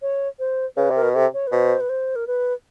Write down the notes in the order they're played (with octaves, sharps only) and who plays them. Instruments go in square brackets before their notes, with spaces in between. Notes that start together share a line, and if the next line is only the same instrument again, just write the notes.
[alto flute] C#5
C5
[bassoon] C#3 [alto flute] B4
[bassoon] C3
[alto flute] A#4
[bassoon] B2
[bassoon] C3 [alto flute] A4
[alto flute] C#5
B4
[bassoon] B2 [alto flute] C5
[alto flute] B4
C5
A#4
B4